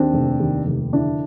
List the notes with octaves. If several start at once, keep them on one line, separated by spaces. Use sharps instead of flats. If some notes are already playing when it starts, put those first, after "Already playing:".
Already playing: D#2 C4 D4
F1
D#2
F1
D3 D4 E4